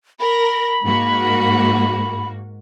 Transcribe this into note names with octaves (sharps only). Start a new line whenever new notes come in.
A#4 B5 A#6
G#2 A#3 F#4